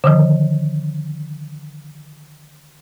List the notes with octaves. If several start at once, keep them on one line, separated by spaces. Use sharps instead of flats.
D3 D#3 F3